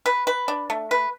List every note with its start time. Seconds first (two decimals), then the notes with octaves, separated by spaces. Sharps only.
0.06 B4
0.27 B4
0.48 D4
0.70 A3
0.91 B4